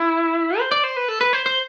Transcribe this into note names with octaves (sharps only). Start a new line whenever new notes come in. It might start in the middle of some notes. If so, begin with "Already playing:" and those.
Already playing: E4
C5
D5
C5
B4
A4
B4
C5
C5